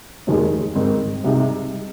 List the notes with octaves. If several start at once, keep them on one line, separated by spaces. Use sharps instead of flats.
F1 D#2 D#3 G#3
G#2 D#3 C4 D#4
C2 C3 G#3 D#4